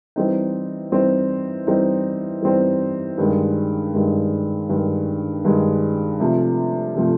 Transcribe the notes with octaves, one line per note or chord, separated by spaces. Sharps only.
E3 G3 C4 D#4
E3 G3 C4 D#4
E3 G3 C4 D#4
E3 G3 C4 D#4
G2 D#3 G#3
G2 D#3 G#3
G2 D#3 G#3
G2 D#3 G#3
C3 F3 A3
C3 F3 A3